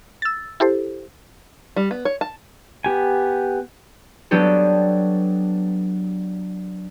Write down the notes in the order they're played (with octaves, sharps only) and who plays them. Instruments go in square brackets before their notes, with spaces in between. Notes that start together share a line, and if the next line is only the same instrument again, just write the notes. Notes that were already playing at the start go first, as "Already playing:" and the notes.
[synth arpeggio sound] E6 A6
E4 G4 A4 C5
[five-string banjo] G3
B3
C#5
A5
[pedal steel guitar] B3 G4 G#5
[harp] F#3 B3 D4 G4 A4